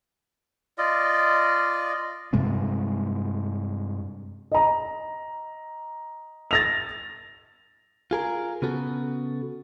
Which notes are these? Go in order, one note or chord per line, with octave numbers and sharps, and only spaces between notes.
F4 D5 D#5
G2 C3 G#3 C4
D#5 A#5
A6 A#6 F7
F4 G#4 A#4
C#3 B3 F#4 A4